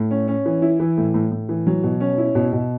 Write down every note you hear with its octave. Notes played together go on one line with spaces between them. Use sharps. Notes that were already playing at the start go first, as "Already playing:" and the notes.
Already playing: A2
C#4
C#4
E3
E4
E3
A2
A2
A2
E3
F#3
B2
C#4
E4
B2
B2